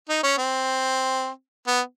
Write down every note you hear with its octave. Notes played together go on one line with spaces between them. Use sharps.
D#4
C#4
C4
B3